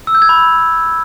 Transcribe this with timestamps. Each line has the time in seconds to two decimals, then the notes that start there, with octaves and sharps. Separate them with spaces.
0.07 E6
0.15 G6
0.22 G#6
0.29 B5